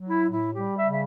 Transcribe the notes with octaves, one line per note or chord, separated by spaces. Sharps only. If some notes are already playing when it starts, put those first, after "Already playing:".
Already playing: F#3
E4
A2
E4
G3 G4
E5
C#3
E5